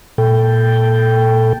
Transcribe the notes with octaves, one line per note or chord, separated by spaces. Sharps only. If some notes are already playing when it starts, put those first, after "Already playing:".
A#2 A4 G5